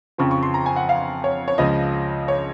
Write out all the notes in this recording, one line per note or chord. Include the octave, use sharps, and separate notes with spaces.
F2 C#3 F3 C#6
C#6
C6
A#5
G#5
F#5
F5
C#5
C#5
C#2 C#3 F3 D#5
C#5